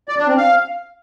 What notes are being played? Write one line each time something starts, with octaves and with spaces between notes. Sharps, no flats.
D5
D4
C4
F5